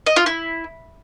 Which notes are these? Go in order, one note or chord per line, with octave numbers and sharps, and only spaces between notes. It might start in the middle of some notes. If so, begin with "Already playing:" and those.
D#5
F4
E4